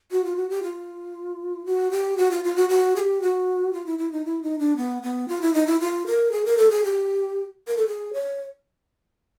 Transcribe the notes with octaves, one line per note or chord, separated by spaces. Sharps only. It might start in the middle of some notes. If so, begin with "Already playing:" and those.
F#4
F4
F#4
G4
F4
F#4
G4
F#4
F4
F4
F#4
F#4
G#4
G4
F#4
F4
E4
E4
D#4
E4
D#4
D4
B3
B3
F4
E4
D#4
E4
F4
A#4
G#4
A#4
A4
G#4
G4
A#4
A4
G#4
C#5